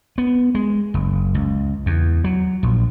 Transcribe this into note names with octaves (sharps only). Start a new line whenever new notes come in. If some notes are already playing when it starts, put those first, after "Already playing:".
B3
G#3
F#1
C#2
E2
F#3
A#1